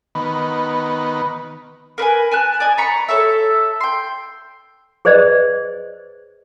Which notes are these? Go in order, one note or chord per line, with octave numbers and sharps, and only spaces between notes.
D#3 B3
A#4 B4 F5 G#5
G#5 A5 F#6
D5 D#5 G#5
A#5 B5 C#6
A4 C#5 E5
G5 C6
G#4 B4 C5 D5 D#5